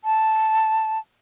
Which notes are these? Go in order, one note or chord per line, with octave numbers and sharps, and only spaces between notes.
A5